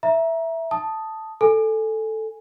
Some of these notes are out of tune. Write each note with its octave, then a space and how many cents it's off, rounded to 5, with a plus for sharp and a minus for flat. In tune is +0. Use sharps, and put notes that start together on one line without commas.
E5 +0 A#5 +20
A5 +0 D#6 +0
A4 +0 G#5 +0